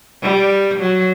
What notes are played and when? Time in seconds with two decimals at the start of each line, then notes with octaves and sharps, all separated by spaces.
0.22 G3
0.80 F#3